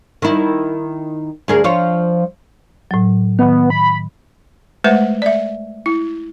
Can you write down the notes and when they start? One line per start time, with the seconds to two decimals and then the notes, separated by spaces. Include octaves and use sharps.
0.22 D#3 E4
1.48 D2 G#4 A#4
1.64 F3 F4 C#5
2.91 A2 F#3
3.39 D#3 B3
3.70 B5
4.84 G#3 A3 B4 C5 E5
5.22 D5 E5
5.86 E4